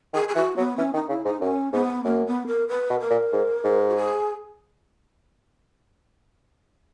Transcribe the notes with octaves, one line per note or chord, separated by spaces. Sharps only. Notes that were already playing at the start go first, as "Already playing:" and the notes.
D#3 G#4
G#4
E3 F#4
F#3 B3
E3 C#4
D#3 D#4
C#3 E4
G#2 D#4
F#2 C#4
G#2 B3
F#2 A#3
B3
A#4
B4
B2
A#4
A#2
G#2
G#2
F#4
G#4